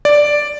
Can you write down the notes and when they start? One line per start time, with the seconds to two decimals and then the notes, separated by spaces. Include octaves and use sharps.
0.05 D5